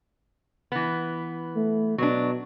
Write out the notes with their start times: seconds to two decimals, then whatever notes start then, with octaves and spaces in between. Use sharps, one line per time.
0.72 E3 B3
1.56 A3
1.98 B2 F#3 D4